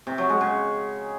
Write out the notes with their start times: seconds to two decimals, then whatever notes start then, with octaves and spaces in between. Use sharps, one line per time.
0.07 C3
0.18 F#3
0.29 G#3
0.41 C#3